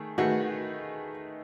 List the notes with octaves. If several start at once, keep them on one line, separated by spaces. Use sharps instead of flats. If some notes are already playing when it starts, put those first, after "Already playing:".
Already playing: D#3 A3 G#4
D#3 A3 D#4 F#4 G#4 B4